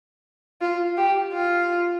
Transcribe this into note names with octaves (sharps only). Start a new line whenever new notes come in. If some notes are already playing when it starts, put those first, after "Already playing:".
F4
G4
F4